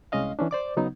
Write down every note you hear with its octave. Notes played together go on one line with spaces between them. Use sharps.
C2 G#3 C#4 D#5 F5
E3 C#4 D4
C5 D5 D6
C#3 F#3 B3 D#4